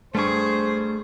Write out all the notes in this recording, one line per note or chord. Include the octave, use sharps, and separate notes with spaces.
G2 A3 G#4 C5 C#6